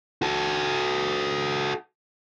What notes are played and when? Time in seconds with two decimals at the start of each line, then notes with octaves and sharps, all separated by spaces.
0.22 F#4 A4